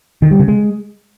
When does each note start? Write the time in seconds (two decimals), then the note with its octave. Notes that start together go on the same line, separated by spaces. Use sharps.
0.22 D#3
0.31 G3
0.39 C#3
0.48 G#3